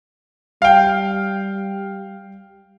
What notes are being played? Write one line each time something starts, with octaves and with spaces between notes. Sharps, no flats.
G3 F5 G5